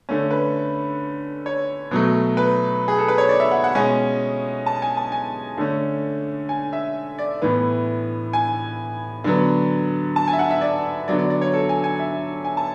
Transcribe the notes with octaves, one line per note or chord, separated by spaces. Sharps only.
D3 A3 C#4
B4
C#5
B2 F#3 A3
B4
G#4
A4
B4
C#5
D5
E5
F#5
F#5
B2 G#3 C#4 G#5
A5
G#5
A5
G#5
D3 A3 C#4
G#5
E5
D5
A2 E3 B3
G#5
D3 F#3 B3
A5
G#5
E5
F#5
E5
D5
D3 F#3 B3 D5
D5
D5
C#5
A4
G#5
G#5
E5
G#5
A5